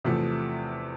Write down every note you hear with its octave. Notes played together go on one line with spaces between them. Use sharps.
E2 C3 F3 A3